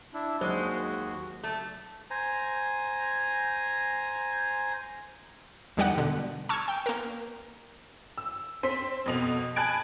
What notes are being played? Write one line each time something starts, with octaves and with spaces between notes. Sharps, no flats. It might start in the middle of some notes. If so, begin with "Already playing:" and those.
D4 E4
D#2 F#3 G#3 F#4 C5
A3
C5 G#5 A#5
E2 D3 G3 D#4 G4 F#5
B2 D3
A5 C#6 E6 F6 G#6
G5
A#3 A#4
E6
C4 C6 B6
F2 B2 F7
G#5 A5 B5 F#6 G#6 D7